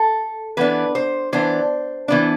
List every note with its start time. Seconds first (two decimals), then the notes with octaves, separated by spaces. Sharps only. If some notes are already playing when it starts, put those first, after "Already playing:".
Already playing: A4
0.57 E3 B3 D4 B4
0.95 C5
1.33 E3 B3 D4 C5
2.08 E3 B3 D4